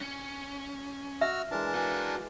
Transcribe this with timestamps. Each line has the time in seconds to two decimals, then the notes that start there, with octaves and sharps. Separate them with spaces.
0.01 C#4
1.21 F#4 E5 E6 F6
1.51 E3 G#3 D4 A#4 A5
1.75 F#4 G#4 F5